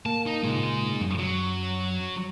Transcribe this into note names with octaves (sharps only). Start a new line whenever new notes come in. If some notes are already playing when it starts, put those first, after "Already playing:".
A#3 A5
D#4
C#2 G2 A#2 G#3 D#4
F#2
F#3